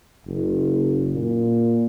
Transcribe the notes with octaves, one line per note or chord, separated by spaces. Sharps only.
F#1
A#2